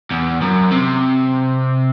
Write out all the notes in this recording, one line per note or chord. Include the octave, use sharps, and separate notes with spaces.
E2
F#2
C3